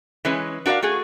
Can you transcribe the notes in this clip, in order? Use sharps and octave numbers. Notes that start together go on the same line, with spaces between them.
E3 G#3 C#4 B4
D4 F#4 A#4 D5 F5
A3 F#4 G#4